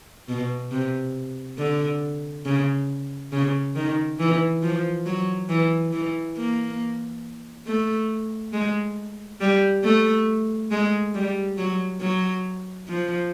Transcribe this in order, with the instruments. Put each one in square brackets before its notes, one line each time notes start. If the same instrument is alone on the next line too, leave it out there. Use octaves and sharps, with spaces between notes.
[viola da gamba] B2
C3
D3
C#3
C#3
D#3
E3
F3
F#3
E3
E3
A#3
A3
G#3
G3
A3
G#3
G3
F#3
F#3
F3